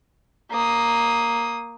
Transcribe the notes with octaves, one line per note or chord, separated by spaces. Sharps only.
A#3 D#6